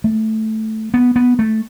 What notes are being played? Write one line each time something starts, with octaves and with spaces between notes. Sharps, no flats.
A3
B3
B3
A3